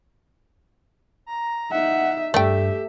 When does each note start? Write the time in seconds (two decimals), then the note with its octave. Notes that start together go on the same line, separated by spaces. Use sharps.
1.26 A#5
1.72 D#4 E5 F#5
2.34 G2 A3 G4 D5 E5 G5